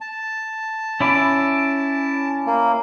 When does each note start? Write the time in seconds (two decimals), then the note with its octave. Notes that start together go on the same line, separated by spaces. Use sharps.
0.01 A5
1.00 C#4 E4 D5
2.46 A#3